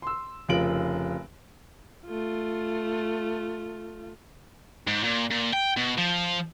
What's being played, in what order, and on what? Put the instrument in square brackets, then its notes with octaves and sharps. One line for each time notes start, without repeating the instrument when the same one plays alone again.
[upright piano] C6 E6
F1 C#3 F4 A#4 D7 F#7
[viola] A3 F4
[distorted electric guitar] G#2
A#2
A#2
G5
B2
F3